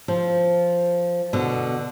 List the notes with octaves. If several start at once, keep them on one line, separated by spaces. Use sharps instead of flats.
F3
B2 D3